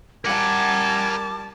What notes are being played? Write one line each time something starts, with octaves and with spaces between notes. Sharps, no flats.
G3 A#4 F#5 G#5 A5 D6